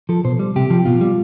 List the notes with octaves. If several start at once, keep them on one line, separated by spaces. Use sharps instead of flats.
F3 A4
B2 C5
G3
C3 G4
F3
B2 F4
G3